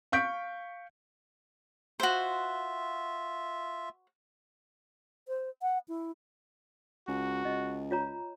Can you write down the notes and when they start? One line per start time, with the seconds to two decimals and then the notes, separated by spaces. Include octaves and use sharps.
0.12 F5 C#6 G6 B6 D7
2.00 F4 F#4 C5 E5
5.28 C5
5.62 F#5
5.88 E4
7.08 C#2 F#4
7.45 C#2 D#5
7.91 F4 C#5 A#5